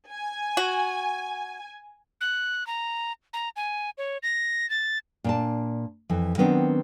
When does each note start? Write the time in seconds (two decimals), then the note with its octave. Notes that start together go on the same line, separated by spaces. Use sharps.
0.11 G#5
0.57 F#4
2.21 F#6
2.67 A#5
3.33 A#5
3.56 G#5
3.98 C#5
4.23 A#6
4.70 A6
5.24 A#2 D4 A5
6.10 F2 E3
6.38 D#3 F#3 B3 C4 D4